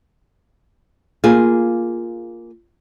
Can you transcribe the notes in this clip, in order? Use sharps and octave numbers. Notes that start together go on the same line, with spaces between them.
A#3 F4 G#4